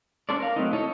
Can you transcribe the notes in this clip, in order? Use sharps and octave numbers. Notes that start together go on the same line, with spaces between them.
C#4 D4 A4 C5 D5
A#4 F5
F#3 A3 C4 D#4
D#4 E4 A4 C#5 D#5